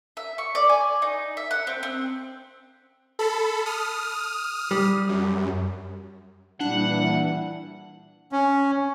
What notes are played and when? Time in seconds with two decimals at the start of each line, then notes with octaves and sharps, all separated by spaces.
0.17 E5
0.38 C#6
0.55 D5
0.70 G#5
1.02 D#4
1.37 E5
1.51 F#5
1.67 C4
1.83 C4
3.19 A4 B5
3.66 D#6 F6
4.71 G3
5.09 F#2
6.61 A#2 E3 G3 D4 E4 F#5
8.32 C#4